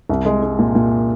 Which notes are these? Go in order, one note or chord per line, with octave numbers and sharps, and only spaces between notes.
C2
G#3
G#3
A#2
A#2